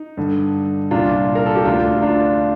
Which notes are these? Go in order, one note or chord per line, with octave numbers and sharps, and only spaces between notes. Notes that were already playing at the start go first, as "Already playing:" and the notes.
Already playing: D#4
G2 D3
C2 A#2 D4 F4
A#4
A4
G4
D2 D3 D4 F4
D4 F4